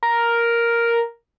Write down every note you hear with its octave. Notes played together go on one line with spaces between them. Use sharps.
A#4